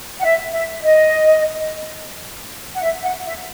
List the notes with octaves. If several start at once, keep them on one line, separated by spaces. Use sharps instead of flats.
F#5
E5
E5
D#5
F#5
E5
F#5
E5